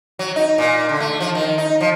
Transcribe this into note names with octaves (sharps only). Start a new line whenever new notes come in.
F#3
D#4
A#2
D3
A3
F3
D#3
D#4
F3